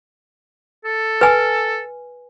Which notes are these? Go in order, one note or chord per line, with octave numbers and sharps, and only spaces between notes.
A4
B4 G#5